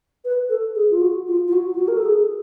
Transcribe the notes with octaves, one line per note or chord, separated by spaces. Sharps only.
B4
A4
G#4
F4
F#4
F4
F4
F#4
F4
F#4
A#4
A4
G#4